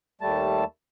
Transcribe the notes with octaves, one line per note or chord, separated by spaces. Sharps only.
D#2 G3 A3 A5